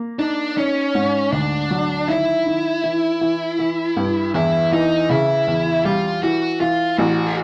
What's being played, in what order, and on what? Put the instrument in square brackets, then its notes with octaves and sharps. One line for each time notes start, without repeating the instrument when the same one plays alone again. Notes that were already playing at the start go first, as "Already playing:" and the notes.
Already playing: [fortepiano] A#3
[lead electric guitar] D4 [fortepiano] D#4
[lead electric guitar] C#4 [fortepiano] D#4
[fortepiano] G#2
[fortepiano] D2 [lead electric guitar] D4
[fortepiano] F#3
[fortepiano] D#3 [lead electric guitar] E4
[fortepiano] D#3
E3
E3
E3
G2
[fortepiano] E2 [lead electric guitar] E4
[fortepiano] E3 [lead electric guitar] D#4
[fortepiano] C#3 [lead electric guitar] E4
[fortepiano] E2
[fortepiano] G3 [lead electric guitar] F4
[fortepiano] E3 [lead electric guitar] F#4
[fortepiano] E3 [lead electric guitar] F4
[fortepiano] A1 [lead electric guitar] F#4
[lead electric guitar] G#4